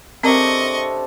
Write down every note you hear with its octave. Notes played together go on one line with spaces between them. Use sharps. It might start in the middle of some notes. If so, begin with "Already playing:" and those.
C3 C4 D4 A4 A#4 D#5 C#6